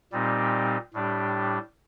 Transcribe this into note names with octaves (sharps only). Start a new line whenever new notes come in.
A#2 G3 C4 D#4 G4
A2 G3 D4 G4